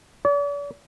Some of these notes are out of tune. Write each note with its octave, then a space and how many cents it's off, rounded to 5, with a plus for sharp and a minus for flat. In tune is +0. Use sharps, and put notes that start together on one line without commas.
D5 -45